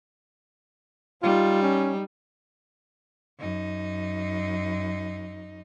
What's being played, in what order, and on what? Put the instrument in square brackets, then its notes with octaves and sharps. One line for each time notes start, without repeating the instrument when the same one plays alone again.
[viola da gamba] G3 D#4 [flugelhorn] F4
[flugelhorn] C#4
[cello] F#2 D#4